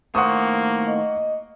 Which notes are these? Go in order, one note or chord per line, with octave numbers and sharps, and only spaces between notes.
D#2 A2 A#3 C5 F#5 C#6 D#6
D#5